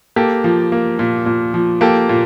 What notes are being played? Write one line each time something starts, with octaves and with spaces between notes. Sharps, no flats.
A#3 G4 A4
F3
A#3
A#2
A#2
F3
A#3 G4 A4
A#2